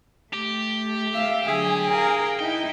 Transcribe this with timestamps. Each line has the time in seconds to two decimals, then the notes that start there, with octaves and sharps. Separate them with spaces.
0.33 A3 G4
1.13 E5 F5
1.48 D3 F#3 G#4 G#5
1.89 A#4 F5
2.40 D#4 E4 G5